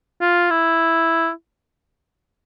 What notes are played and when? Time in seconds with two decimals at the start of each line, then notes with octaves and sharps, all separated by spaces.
0.21 F4
0.50 E4